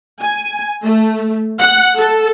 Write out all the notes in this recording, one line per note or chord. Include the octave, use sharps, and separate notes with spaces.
G#5
A3
F#5
A4